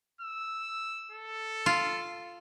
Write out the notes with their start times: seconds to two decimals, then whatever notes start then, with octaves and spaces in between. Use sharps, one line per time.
0.21 E6
1.11 A4
1.66 F4